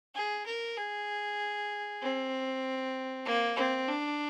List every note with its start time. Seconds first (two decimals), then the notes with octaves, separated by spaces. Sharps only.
0.15 G#4
0.46 A#4
0.77 G#4
2.01 C4
3.25 A#3
3.56 C4
3.88 D4